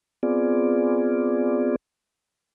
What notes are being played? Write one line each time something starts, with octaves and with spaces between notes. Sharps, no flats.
B3 C4 F4 G#4 D5